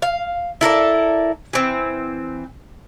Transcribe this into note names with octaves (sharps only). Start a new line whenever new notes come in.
F5
E4 A4 A#4 D5
E3 C4